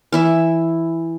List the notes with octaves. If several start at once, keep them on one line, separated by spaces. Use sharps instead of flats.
E3 E4 E5